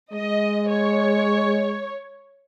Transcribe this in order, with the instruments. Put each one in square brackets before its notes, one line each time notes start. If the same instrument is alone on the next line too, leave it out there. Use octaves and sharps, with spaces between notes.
[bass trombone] G#3 [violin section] D#5
[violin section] C#5